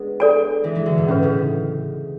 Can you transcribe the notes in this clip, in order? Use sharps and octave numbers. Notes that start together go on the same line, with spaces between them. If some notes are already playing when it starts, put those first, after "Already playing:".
Already playing: G#3 B3 D4
A4 D5 G#5
E3 G#3
E3 G#3
D3 F#3
G#2 B2
A2 C#4 G#4 B4
A2 C#3